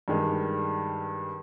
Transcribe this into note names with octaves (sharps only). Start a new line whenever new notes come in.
G2 D#3 G#3